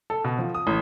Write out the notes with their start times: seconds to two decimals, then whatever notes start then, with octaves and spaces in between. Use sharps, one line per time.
0.10 A4
0.24 B2
0.39 F3
0.54 D#6
0.67 A1